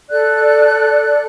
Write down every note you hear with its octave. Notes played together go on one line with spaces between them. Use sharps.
A4 D5 F#6